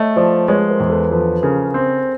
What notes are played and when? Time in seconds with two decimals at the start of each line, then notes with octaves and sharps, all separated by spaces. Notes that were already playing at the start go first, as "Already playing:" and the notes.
Already playing: A3 C#5 D#5
0.16 F3 C5 D5
0.48 G#3 B4 C#5
0.69 A#4 C5
0.80 E2
0.90 A4 B4
1.11 F3 A4 B4
1.43 C#3 G#4 A#4
1.74 C4